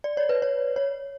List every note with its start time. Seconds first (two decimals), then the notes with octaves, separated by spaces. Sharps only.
0.04 D5
0.17 C#5
0.29 B4
0.42 C#5
0.76 C#5